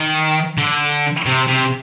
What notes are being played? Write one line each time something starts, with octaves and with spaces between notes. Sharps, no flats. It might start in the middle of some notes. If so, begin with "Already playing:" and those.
Already playing: D#3
D3
C3
C3